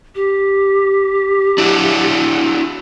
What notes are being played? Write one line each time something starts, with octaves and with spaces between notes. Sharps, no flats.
G4
D4 E4 F#4